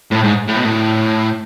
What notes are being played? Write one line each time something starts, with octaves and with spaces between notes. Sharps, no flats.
A2
G#2
A2
B2
A2